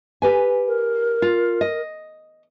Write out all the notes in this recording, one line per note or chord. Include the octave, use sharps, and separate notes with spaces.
G4 B4 G#5
A#4
F4
D#5